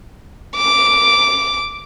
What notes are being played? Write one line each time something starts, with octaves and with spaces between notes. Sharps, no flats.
D6